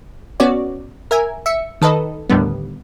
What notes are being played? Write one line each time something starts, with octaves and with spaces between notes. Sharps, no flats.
B3 C#4 F#4 C#5 D5
A#4 E5 G#5
E5 C#7
D#3 A4 B4 D#5
D#2 A2 D3 G3 B3